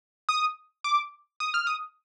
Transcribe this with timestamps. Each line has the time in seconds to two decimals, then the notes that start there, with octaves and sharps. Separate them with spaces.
0.29 D#6
0.84 D6
1.40 D#6
1.54 F6
1.67 D#6